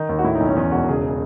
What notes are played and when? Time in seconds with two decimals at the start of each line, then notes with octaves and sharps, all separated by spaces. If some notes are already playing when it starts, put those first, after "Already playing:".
Already playing: D#3 D#4
0.09 D#2
0.19 F#4
0.24 A2 E4
0.35 D#4
0.40 B1
0.46 C#4
0.56 E2 C#4
0.72 E1 F#4
0.88 C#3 G#4